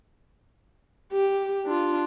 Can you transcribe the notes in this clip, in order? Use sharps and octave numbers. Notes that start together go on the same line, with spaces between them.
G4
D4 F4